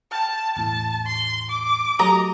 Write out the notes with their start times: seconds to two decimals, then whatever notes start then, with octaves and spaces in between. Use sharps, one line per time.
0.12 G5 A5 F6
0.56 E2 A2 A5
1.07 C6
1.50 D6
1.99 F#3 A3 G4 D#5 A#5